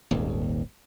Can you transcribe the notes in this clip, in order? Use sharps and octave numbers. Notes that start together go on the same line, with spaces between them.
D#1 G#1 D#2